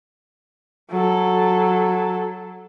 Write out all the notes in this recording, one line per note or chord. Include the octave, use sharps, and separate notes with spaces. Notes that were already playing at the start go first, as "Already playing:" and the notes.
F#3 A4